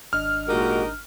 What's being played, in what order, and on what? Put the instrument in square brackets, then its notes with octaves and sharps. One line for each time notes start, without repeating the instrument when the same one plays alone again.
[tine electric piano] G#1 D4 D#5 [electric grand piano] F6
[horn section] A#2 G#3 F#4 [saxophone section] D#4 G4 A#4